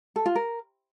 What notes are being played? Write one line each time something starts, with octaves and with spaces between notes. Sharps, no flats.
A4
F4
A#4